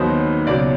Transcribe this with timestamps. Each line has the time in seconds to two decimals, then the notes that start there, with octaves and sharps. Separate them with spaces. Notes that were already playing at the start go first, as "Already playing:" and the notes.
Already playing: D#2 D#3 F#3 B3 D#4 C5
0.47 C#2 B2 F#3 D5